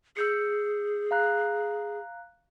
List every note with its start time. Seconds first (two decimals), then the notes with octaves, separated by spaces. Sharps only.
0.17 G#4 E6 G6 C#7
1.11 F5 A#5 F#6